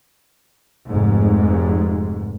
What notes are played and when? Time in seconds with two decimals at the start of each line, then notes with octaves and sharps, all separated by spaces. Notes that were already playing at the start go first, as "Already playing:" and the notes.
0.89 F1 G#2